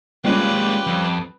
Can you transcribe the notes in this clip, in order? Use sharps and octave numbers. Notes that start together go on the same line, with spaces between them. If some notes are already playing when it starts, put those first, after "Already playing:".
G3 G#3 A#3 C#4 F4 G4 B4
F2